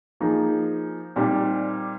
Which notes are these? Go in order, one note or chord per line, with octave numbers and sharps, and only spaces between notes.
F3 A#3 D#4 G#4
A#2 G3 C4 D#4 G4